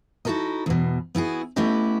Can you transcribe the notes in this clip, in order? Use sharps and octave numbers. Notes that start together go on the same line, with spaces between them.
D#4 E4 F#4 A4 A#4 D#5
E2 B2
B3 E4 F#4 G#4
A3 B3 C#4 E4 G4 D#5